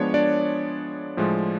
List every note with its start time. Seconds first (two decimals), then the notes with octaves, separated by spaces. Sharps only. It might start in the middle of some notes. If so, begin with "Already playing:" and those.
Already playing: F3 G#3 B3 D4 C#5
0.14 D4 D5
1.17 A2 F3 G#3